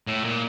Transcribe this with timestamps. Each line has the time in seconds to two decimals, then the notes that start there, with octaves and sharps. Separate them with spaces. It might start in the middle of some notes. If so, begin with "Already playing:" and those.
0.07 A2
0.24 A#2